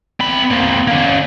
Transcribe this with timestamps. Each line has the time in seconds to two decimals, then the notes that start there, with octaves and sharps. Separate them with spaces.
0.20 C4 B5
0.50 A#3 C4
0.88 A#3 C#4